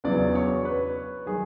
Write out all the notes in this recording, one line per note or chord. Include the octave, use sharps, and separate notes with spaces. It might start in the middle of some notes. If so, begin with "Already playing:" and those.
E2 C#3 F#3 B3 D4 D5
C#5
B4
D#3 F#3 G#4